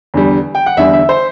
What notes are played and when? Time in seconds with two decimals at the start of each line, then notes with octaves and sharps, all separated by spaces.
0.14 E2 D3 G3
0.55 G5
0.66 F#5
0.77 E2 D3 G3 E5
0.93 E5
1.09 C5